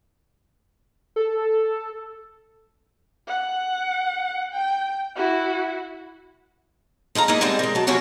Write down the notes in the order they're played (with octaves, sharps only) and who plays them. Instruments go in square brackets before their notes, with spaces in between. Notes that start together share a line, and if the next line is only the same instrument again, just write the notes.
[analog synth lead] A4
[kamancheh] F#5
G5
E4 F#4
[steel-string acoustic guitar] G#3 A4 F5 A#5
G#3 A#3 D#4 E4
D3 G3 G#3 C4 D5
G#3 A#4
F#3 A5
F2 C3 F#3 A#3 C#4 F#4